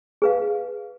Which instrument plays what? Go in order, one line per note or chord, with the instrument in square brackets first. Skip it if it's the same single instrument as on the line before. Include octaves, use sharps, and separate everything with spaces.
[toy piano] G#4 B4 F5